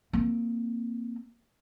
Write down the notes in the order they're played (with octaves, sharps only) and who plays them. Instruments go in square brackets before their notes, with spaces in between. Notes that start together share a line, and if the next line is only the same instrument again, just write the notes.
[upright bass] A#3 C4